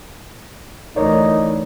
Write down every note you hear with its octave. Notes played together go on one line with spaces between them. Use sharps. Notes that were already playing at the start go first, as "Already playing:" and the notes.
D2 E3 D#4 A#4 C#5 D5